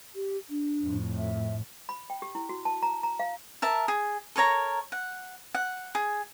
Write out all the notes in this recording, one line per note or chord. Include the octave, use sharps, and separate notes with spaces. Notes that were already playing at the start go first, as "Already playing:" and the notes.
G4
D4
F2 A2
E5
B5
G5
G4
E4
F#4
A5
A#5
A#5
F5
A#4 E5 A5
G#4
A4 A#4 C#5 A#5
F#5
F#5
G#4